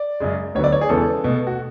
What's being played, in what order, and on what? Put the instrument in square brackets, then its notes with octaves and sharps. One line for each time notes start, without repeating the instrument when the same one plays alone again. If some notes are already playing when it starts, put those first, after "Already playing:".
Already playing: [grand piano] D5
F#2 C#3 G#3
D2 D3 F#3 B3 C#5
D5
C#5
G#4
E2 C#3 G#3 B3 A4
B2 A3
F#4